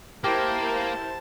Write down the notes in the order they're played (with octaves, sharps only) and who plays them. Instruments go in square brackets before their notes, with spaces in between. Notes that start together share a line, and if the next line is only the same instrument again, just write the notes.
[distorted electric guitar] A#3 [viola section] E4 A#4 C5 [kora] G4 [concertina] A5